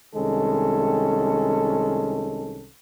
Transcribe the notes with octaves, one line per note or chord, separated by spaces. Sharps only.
C2 D#3 G#3 C#4 A4